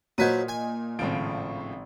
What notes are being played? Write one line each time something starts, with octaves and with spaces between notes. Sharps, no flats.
A#2 F#3 B4 C5 D#5 G#6 B6 D#7
G#5
G#1 A2 C#3 F3 D7